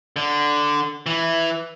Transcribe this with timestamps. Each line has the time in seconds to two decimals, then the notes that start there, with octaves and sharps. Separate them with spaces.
0.16 D3
1.06 E3